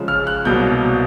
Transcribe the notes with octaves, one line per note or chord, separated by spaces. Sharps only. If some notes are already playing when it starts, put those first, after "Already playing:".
Already playing: C#3 F3 G#3 C#4
F6
F#6
C2 B2 F#3 A#3 G6